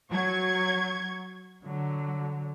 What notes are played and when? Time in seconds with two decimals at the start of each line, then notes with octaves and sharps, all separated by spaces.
0.10 F#3 C#6 G#6
1.65 D3 F#3